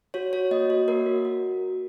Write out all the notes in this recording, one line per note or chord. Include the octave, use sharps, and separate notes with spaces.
F#4 C#5
F#4 C#5
A#3 D#5
F#4 C#5
A#3 A#4
F#4
F#4